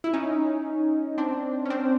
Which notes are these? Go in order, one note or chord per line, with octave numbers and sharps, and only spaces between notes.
E4
C#4 D#4
C4 D4
C#4
C4 D4